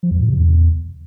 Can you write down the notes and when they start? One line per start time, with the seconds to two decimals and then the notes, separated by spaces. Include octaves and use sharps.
0.03 F3
0.11 F2
0.19 A2
0.28 C3
0.36 E2